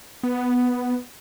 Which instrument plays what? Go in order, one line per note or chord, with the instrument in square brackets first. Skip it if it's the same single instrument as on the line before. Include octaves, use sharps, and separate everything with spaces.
[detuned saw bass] B3